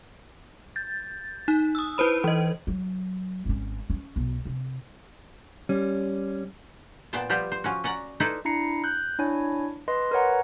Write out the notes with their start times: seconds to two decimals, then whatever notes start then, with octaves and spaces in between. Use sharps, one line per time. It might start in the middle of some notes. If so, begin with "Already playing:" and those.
0.76 G6 A6
1.48 D#4
1.75 D#6 E6
1.98 E4 B4 C5 B5
2.24 E3 D#5
2.67 F#3
3.45 G#1 C#4
3.90 C#4
4.16 B1
4.45 C3
5.69 G3 C#4
7.13 A#2 B3 C5 G5 A5
7.30 F3 G3 B3 G4 C5
7.52 C5
7.64 F3 C#4 F#4
7.84 C#4 D5 F#5 A#5
8.20 D#4 E4 A4 B4 C5 D5
8.45 D4 E4 A#5 C7 C#7
8.84 F#6 G6
9.19 D4 E4 C#5 G#5
9.88 B4 D#5 C6
10.11 A#4 B4 C#5 F#5 A#5